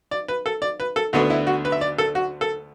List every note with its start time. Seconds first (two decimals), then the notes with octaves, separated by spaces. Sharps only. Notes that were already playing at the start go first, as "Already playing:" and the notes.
0.11 D5
0.28 B4
0.46 A4
0.62 D5
0.80 B4
0.96 A4
1.13 D2 D3 B3 D4 F#4
1.30 E4
1.47 F#4
1.65 B4
1.72 E5
1.81 D5
1.98 A4
2.15 F#4
2.41 A4